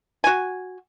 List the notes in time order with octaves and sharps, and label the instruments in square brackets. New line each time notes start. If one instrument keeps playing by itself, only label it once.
[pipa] F#4 G#5